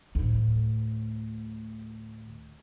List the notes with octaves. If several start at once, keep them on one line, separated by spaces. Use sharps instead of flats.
D2 A2